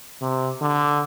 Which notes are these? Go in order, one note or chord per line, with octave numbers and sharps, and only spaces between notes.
C3
D3